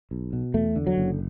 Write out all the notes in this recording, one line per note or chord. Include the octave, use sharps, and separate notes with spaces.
B1
B2
E2 A3
D3
F#3
F#1